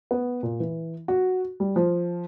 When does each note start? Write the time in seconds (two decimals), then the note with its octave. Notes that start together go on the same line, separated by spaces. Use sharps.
0.11 B3
0.43 A#2
0.60 E3
1.08 F#4
1.60 G3
1.76 F3